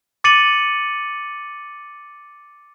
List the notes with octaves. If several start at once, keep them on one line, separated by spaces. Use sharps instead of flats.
D6 A6 C#7 D#7 F#7